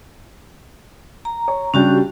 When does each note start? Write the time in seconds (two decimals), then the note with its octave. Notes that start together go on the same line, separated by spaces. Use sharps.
1.25 A#5
1.48 C#5
1.74 C#3 G3 C#4 D4 F#4 G4